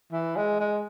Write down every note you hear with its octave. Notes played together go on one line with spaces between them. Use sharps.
E3
G#3
G#3